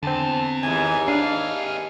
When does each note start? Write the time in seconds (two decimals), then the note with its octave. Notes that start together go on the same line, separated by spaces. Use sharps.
0.03 E2 D3 C4 A5
0.63 D#2 G#2 E3 G#5
1.08 C4 D4 G#4 F5